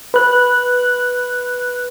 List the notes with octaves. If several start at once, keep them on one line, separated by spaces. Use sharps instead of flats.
B4 F#6